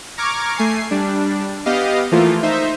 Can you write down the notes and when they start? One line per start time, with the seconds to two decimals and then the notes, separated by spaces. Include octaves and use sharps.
0.18 A#5 C#6 D6 F6 G#6
0.56 A3 G#5 C7
0.91 G3 D4
1.66 B3 G4 D#5 F5
2.12 E3 F3 A3 A#3 F4
2.43 D#4 C5 E5